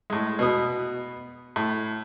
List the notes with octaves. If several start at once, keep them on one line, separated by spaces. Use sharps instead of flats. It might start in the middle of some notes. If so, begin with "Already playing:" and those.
A2 G#3
B2 B3 D#6
A2